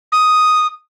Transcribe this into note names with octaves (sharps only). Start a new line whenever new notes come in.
D#6